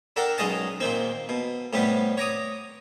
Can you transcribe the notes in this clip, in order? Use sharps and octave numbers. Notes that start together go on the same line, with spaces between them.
D4 A4 A#4 F#5 G5
B1 G#3 C#4 D#5 A5
A#2 D#3 C4
B2
A2 C3 G3 B3
C#5 A#5 D6 D#6